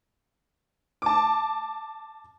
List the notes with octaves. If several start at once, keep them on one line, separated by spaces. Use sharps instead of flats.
A5 D6